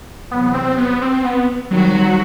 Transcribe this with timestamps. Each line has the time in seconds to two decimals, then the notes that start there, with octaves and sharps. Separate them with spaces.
0.31 E2 C3 F#3 B3
0.54 C4
0.78 B3
1.02 C4
1.24 B3
1.71 D#3 F#3 G3 C4 F#4
1.94 F#3